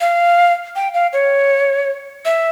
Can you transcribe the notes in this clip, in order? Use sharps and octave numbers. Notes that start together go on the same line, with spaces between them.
F5
G5
F5
C#5
E5